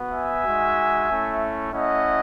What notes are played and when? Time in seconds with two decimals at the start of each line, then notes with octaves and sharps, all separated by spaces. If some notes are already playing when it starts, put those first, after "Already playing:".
Already playing: B3 F#4
0.11 E5 G#5
0.44 G#3 D#4 F#4
1.08 A3 C#4 E4
1.72 A3 C#4 E4 D#5 F#5